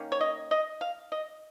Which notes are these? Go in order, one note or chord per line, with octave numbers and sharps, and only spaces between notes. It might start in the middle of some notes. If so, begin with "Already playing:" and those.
Already playing: D#3 A#3 C#4
C#5
D#5
D#5
F5
D#5